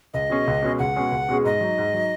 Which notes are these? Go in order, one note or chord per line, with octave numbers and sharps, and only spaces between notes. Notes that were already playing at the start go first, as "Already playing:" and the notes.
C#2 D#5
B2 G#3 C#4 G#4
C#2
B2 G#3 C#4 G#4
C#2 F#5
B2 G#3 C#4 G#4
C#2
B2 G#3 C#4 G#4
G#2 D#5
F#3 D#4
G#2
F#3 D#4